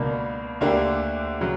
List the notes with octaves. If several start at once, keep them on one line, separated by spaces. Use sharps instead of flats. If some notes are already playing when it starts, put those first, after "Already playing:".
Already playing: C#2 B2 A#3 D4
D2 D3 A#3 D4 G4
C#3 F#3